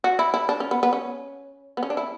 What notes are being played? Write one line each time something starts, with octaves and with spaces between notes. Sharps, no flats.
F#4
E4
E4
D4
C#4
B3
B3
C#4
B3
C#4
D4
E4